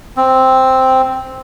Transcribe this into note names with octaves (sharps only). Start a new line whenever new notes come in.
C4